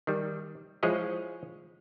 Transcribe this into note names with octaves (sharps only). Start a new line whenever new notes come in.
D#3 G3
F3 G#3 E4 G#4 C#5 D#5